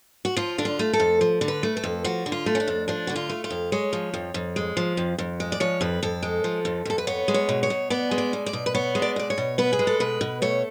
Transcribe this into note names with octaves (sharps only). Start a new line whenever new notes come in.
F#4
F3 F4
D3 D4
F4
A3
A4
F2
F3
D3
B4
A3
A4
F2
F3 F#4
D3
F4
A3
C#4
D4
F2
F3 D4
D3 F#4
F4
A3
F4
F2
G#3 C#5
F3
F2
F2
G#3
F3
F2
F2
G#3
D5
F3 C#5
F2 B4
F2 A4
G#3
F3
F2
F2 A4
B4
B3 C#5
G#3
C#5
B2
C#5
B2
B3 D5
G#3
D5
B2
D5
B2
B4
B3 C#5
G#3
D5
B2 D5
C#5
B2
B3 B4
G#4
G#3
A4
B2 B4
B2
A3 C#5